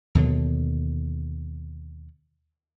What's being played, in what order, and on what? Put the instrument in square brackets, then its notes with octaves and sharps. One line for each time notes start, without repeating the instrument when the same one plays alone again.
[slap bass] D#2 B2 D3 F#3